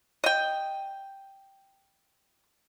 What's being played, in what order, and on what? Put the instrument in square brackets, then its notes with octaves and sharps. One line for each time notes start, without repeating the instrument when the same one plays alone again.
[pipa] D#5 G5